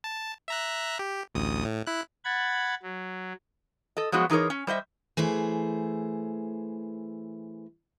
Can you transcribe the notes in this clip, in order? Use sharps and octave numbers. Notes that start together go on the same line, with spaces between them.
A5
E5 A#5 F#6
G4
A1 D2 D#6
A2
E4 F#6
F#5 B5 G#6 A6
F#3
A4 D#5
F3 F#3 G#3 B3 F#4
E3 D#4 G#4 A#4 C#5
C#4
G3 C5 D#5 E5
E3 A3 G#4 C5